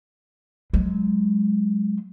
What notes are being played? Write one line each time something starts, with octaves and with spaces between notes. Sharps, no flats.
F#3 G#3